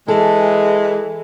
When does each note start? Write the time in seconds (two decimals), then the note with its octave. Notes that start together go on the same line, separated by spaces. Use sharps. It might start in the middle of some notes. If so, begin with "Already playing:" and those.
0.08 E3 G#3 A4